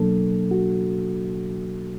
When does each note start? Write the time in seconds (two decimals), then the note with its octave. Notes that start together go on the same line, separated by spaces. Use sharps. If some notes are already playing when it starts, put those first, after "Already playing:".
Already playing: B2 F#3 A#3 D4 A4
0.51 F#4